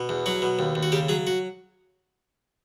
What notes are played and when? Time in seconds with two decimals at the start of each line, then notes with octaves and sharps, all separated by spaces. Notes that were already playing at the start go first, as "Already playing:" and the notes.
Already playing: B2
0.09 E2
0.26 F#3 F#4
0.42 B2
0.59 D#2
0.75 D#2
0.83 F#4
0.92 C#3 G4
1.09 F#3 G#4
1.27 F#4